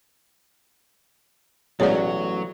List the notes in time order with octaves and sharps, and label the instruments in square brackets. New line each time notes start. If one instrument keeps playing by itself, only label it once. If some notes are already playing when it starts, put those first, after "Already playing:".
[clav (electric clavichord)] A1 [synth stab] B2 G#3 [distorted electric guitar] F#3 [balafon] C#5 D5